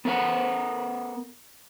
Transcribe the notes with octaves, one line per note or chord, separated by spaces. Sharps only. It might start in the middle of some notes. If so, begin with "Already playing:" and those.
B3 A4 A#4 E5 F#5